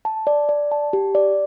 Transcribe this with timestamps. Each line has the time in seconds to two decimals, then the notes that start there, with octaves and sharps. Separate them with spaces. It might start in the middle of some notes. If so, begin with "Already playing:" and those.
0.05 A5
0.27 D5
0.49 D5
0.71 A5
0.93 G4
1.15 D5